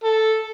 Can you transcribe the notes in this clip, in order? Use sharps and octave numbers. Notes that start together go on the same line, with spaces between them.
A4